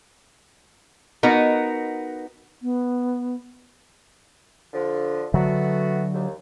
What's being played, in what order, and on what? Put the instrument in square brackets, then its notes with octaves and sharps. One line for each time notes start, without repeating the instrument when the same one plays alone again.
[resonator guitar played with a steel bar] B3 D#4 F#4 A#4
[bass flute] B3
[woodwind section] D3 F3
[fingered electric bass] D3 F#3 [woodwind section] A3 B3 F#4
[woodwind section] D#2